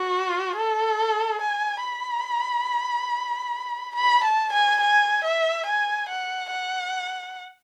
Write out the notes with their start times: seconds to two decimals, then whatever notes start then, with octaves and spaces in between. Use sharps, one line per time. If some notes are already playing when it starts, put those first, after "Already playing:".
Already playing: F#4
0.57 A4
1.42 G#5
1.84 B5
3.96 B5
4.24 A5
4.53 G#5
4.81 G#5
5.24 E5
5.66 G#5
6.09 F#5
6.51 F#5